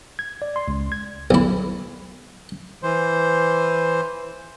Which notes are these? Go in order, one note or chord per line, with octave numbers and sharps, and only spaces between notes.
G#6
D5
C6
C#2
G#6
B1 E4
E3 C5